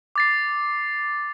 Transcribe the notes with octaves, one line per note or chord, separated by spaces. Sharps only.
D6 A6 C7